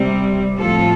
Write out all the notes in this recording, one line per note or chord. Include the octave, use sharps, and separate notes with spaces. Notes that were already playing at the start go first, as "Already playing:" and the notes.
Already playing: C3 G3 C4
A2 F3 C4 F4 A4